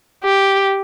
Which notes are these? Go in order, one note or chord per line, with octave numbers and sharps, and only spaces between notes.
G4